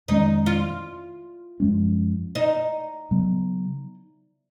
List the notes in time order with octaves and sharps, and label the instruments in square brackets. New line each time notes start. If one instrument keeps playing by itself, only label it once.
[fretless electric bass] F2 D#3 G#3 C#4 [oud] D#4
[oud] F4
[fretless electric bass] F#2 F3 G#3 C#4
[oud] D#4
[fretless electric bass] C#3 F#3 B3